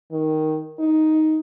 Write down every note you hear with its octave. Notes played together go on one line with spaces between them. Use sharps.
D#3
D#4